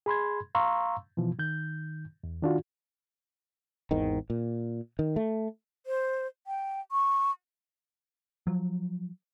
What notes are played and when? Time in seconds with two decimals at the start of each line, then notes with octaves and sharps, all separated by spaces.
0.06 G#4 B5 C6 G#6
0.55 F5 A#5 C6 C#6 E6
1.17 B2 E3 F3
1.39 D#3 G6
2.24 E2
2.42 D#3 D4 F4 F#4
3.91 G#1 E2 G#2 D#3
4.30 A#2
4.99 D#3
5.16 A3
5.86 C5
6.47 G5
6.92 C#6
8.47 F3 F#3